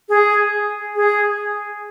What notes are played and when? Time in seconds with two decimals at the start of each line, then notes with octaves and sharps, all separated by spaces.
0.09 G#4
0.95 G#4